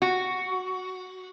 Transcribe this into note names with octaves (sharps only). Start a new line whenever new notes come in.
F#4